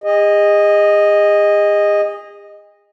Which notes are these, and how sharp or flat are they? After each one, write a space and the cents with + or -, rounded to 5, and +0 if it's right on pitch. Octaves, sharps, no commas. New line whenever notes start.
G#4 -40 D#5 -5